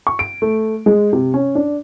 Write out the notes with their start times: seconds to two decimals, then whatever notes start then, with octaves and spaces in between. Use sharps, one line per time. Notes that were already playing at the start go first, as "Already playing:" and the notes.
0.07 C#6
0.19 D7
0.42 A3
0.86 G#3
1.13 C3
1.34 C#4
1.55 D4